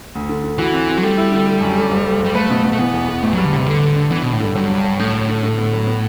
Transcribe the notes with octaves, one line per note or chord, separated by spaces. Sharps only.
D2
D3
D3
E3 F#4
C4
C4
F#3
G3 A3
E4
D3
A3
F#2
A3
F#1
A3
F#1 G3
A3 B4
B2
B2
A3
E3 B3
E2
E2
A1 A3
F#3 G3
D3
A1 C3
D3 A3
A3
D4
E3 B3
B2 B3
A2
G2 D3
G2 F#3
C2
F#3
A2 D3
A3
D3
D3
B3
F#3
B3